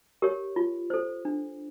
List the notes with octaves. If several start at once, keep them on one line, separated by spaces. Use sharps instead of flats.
G4 A#4 C#5
F4
A4 C5
D4